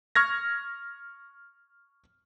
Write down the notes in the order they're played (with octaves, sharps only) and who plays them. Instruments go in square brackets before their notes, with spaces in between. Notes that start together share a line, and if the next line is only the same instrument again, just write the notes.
[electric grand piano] C#6 F6 G#6 A#6